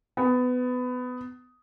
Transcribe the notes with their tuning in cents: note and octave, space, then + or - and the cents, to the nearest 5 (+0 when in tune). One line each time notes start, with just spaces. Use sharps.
B3 +20